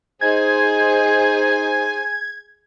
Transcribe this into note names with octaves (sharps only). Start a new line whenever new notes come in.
D#4 G#4 C5 G#5 G#6